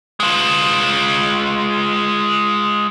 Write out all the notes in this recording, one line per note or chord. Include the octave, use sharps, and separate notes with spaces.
G#3 F4